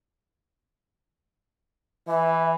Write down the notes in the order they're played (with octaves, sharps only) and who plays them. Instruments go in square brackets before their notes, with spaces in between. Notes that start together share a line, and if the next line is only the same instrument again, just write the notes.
[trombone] E3 [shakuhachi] E5